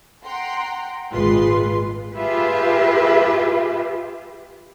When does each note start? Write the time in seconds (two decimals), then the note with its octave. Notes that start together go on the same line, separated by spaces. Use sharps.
0.23 F#5 G5 A#5 C6
1.12 G#1 A#2 G#3 F4 B4 C6
2.16 F4 G4 G#4 B4 E5